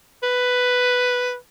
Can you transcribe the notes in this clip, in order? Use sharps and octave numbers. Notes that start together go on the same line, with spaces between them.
B4